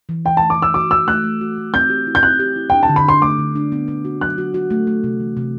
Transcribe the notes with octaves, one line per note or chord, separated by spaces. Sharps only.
E3
E3 G5
A3 A5
D6
E3 E6
F#4 D6
F#4 E6
A3 F#6
A3
F#4
A3
C4 G6
G4
E4
G6
C4 F#6
G4
E4
D4 G5
A5
D3
B5
D4 C6
A3 D6
D3
D4
B3
B3
F#4
F#3 F#6
F#4
F#4
A3
A3
C3
E3
C3